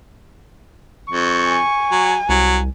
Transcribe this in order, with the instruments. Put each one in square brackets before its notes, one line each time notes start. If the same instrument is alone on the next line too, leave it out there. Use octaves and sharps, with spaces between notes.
[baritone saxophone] F2 [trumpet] C#6
[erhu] G#5
[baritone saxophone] F#3
[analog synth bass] C2 [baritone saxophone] F#3